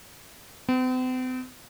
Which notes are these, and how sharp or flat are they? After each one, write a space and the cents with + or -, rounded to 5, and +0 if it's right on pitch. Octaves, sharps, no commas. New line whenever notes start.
C4 -45